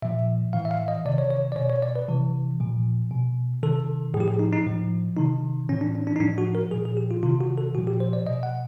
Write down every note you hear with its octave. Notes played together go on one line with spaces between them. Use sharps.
A#2 F3 E5
A2 E3 F5
E5
F5
D#5
C3 D#3 D5
C#5
C#5
D5
B2 C#5
C#5
D5
B4
C3 E3
A#2 F3
B2
C3 D#3 A4
A2 F3 G4 G#4
G#4
D#4
D#4
A2 F3
C3 D#3 D#4
A2 E3 C#4
D4
C#4
D4
D#4
A2 F3 D4
F#4
A#4
A#2 F3 G#4
G#4
G4
F4
C3 D#3 F4
F#4
A4
A#2 F3 F#4
G4
C5
D5
B2 D#5
F#5